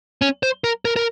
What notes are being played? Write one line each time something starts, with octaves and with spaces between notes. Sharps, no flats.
C#4
C5
A#4
A#4
A#4